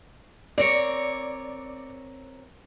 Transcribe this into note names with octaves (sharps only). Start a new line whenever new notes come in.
C4 A#4 C#5 D5